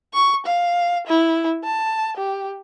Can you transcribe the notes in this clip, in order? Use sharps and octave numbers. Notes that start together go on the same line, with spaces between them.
C#6
F5
E4
A5
G4